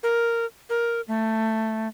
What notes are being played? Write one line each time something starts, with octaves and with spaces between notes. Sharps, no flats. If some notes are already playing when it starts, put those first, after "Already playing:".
A#4
A#4
A3